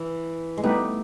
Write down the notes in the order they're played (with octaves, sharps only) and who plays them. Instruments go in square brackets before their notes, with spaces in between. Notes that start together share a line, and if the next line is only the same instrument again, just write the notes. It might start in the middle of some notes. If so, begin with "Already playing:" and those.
Already playing: [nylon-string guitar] E3
G#3
[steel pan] G3 B3 D#4 G4 B4 [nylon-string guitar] A3